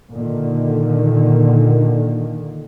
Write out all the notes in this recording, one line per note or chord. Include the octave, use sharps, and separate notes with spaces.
A#2 D3 D#3